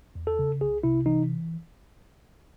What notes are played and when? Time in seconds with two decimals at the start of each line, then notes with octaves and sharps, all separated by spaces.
0.15 E2
0.27 A4
0.39 C#3
0.61 C2 G#4
0.83 C3 E4
1.06 E3 D#4